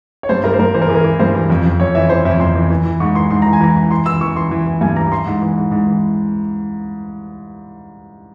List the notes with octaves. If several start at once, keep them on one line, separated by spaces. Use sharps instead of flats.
C#5
G2 C5
G2 A#4
C5
G2 A#4
E3 C5
A#4
E3 G#4
A#4
E3
G2 C5
E3
F2
F2
F2 C#5
E3 E5
E3 C5
F2 E5
F2 C6
E3
E3
E3
G#2 C#6
E3 C6
G#2 C6
E3 A#5
G#5
E3 A#5
E3
E3 C6
E3 E6
E3 C#6
E3 C6
E3
E3
G2 G#5
E3 A#5
E3 C6
G#2
E3
G#2
G#2
E3